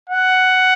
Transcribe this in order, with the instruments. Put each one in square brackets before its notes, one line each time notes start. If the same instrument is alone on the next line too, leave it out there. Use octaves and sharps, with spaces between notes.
[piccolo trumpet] F#5